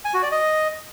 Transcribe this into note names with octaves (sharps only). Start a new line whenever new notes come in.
G#5
F#4
D5
D#5